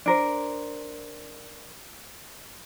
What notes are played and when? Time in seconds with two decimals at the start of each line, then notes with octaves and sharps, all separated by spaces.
0.06 D4 A#4 C5